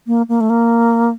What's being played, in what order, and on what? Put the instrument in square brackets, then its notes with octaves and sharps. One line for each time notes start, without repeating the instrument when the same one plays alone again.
[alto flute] A#3
A#3
A3
A#3